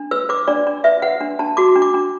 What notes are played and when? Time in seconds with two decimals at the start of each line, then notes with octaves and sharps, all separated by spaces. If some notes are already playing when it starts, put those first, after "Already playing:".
Already playing: D4
0.11 B4 E6
0.29 B4 D6
0.47 D4 D5
0.67 D4
0.84 B4 E5
1.02 B4 F#5
1.21 D4
1.39 D4 A5
1.57 F#4 D6
1.76 D4
1.82 D6
1.94 D4